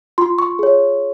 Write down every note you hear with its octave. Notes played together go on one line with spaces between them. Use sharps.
F4 C6
C#6
G#4 C#5